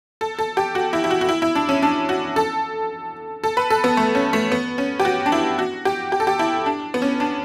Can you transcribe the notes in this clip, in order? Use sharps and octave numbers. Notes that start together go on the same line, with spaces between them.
A4
A4
G4
F#4
E4
E4
F#4
F#4
E4
E4
D4
C#4
D4
F#4
A4
A4
B4
A4
B3
A3
C#4
A3
B3
C#4
G4
F#4
D4
E4
F#4
G4
G4
A4
G4
E4
D4
B3
C#4
D4